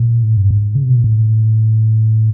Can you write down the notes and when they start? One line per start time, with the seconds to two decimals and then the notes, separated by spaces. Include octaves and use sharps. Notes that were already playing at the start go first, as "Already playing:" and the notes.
Already playing: A#2
0.23 A2
0.37 G2
0.51 G#2
0.75 C#3
0.83 C3
0.90 B2
0.97 A#2
1.04 A2